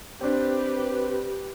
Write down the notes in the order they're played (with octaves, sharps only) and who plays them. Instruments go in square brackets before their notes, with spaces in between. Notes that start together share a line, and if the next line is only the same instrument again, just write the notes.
[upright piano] C4 D4 [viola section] G4 B4